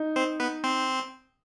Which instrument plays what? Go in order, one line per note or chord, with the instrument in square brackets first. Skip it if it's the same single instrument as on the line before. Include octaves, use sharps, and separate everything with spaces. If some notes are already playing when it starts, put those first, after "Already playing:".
Already playing: [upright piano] D#4
[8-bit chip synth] C4 C5
B3 B4
C4 C5